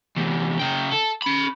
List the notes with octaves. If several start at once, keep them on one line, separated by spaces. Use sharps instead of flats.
E2 C3
C#3 G5
A4
C#4 B5